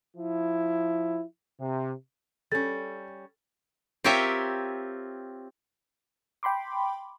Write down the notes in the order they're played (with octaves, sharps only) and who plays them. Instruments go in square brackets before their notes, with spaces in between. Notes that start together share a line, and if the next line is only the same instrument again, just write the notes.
[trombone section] F3 E4
C3
[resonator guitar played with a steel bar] G3 C#4 [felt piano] A4 [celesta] A6
[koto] C4 F4 G4 A#4 C#5 E5
[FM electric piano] G5 B5 C6 D6